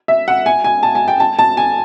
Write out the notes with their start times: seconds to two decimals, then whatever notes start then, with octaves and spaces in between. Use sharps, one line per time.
0.08 E5
0.28 F#5
0.46 G#5
0.64 G#5
0.83 A5
0.95 G#5
1.08 G5
1.20 A5
1.39 A5
1.57 G#5